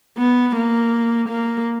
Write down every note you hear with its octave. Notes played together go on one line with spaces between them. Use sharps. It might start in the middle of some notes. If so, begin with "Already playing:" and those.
B3
A#3
A#3